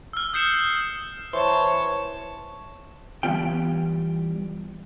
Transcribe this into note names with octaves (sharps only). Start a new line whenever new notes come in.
E6 F6
D#6 G6 C7 C#7 E7
E3 C5 C#5 A5
E3 G3 B3 F4 G5